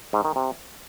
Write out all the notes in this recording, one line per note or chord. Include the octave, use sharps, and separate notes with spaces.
G#2
D#3
C3